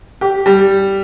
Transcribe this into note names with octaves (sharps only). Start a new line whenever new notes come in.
G4
G3